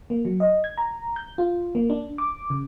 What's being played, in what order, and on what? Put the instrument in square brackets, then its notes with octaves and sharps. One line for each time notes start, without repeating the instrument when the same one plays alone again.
[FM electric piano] A#3
F#3
D#5
G#6
A#5
G6
F4
A#3
D4
D6
C#3